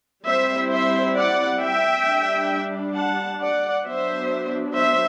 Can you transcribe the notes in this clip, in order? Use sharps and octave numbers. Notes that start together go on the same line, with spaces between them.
G3 C4 E4 C5 E5
C5 E5
D5 F#5
E5 G5
G3 D4
F#5 A5
D5 F#5
F#3 B3 D4 C5 E5
C5 E5